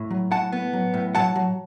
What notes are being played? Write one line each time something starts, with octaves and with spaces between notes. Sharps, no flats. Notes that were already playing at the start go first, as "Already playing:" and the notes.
Already playing: A2
F#3
A2 F#5 A5
B3
F#3
A2
F#3 F#5 A5
F#3